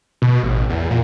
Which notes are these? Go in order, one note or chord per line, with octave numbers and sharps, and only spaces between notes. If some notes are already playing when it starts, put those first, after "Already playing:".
B2
A1
E2
A#2